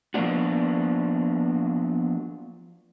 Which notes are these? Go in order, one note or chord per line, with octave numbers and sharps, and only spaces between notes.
F3 F#3 A#3 B3 D4 F#4